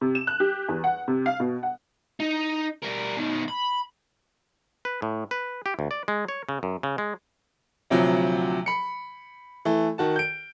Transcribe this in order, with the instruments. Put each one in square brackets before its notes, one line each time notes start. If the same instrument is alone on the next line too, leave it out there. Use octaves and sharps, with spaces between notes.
[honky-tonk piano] C3
E7
F#6
G4
E2
F#5
C3
F5
B2
F#5
[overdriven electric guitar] D#4
G3 A#4
B2 D#3
B5
[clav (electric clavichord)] B4
A2
B4
G4
D2
D5
G#3
C#5
C#3
F#2
C#3
G#3
[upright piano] D2 C3 F3 F#3
B5 C#7
E3 A3
D#3 F#4 A5
G6 D7